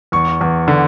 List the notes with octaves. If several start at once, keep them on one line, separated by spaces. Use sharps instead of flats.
E2 C#6
E2
D3